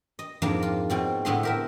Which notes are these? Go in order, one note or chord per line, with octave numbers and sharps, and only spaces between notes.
D#5
F2 G#2 A#3 D4 A#5
F4
B2 C4 F4
A2 D3 B3 E4 D#5 C6
G4 A#4 E5